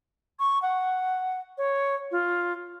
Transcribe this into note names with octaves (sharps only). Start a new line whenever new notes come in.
C#6
F#5
C#5
F4